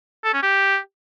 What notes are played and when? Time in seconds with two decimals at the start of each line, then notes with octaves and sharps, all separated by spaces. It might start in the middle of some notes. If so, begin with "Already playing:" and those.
0.25 A4
0.34 C#4
0.43 G4